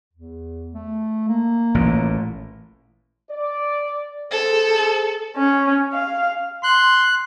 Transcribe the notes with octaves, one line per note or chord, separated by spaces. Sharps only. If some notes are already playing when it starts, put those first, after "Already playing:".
E2
A3
A#3
A1 A#2
D5
G#4 A4 C5
C#4
F5
C6 F#6